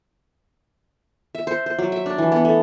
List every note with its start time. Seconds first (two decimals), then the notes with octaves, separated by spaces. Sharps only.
1.35 E5
1.47 C5
1.66 C5
1.78 F#3
1.92 E5
2.06 D4
2.18 E3
2.32 B3
2.45 A3